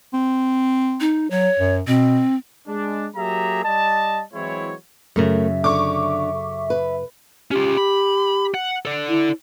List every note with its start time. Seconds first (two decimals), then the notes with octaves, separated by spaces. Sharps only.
0.14 C4
1.00 D#4
1.31 F#3 C#5
1.59 F#2
1.87 B2 C4
2.68 G#3 D4
3.16 F#3 A#3 G4 G#4 E5 A#5
3.64 G3 D5 D#5 A5
4.33 E3 F#3 G#3 C4 E4 C#5
5.16 F#2 C#3 A3 A4 A#4 E5
5.64 D3 C#6 D6
6.70 B4
7.51 C#4 F4 G4
7.77 B5
8.54 F#5
8.85 A4 D5
9.08 E4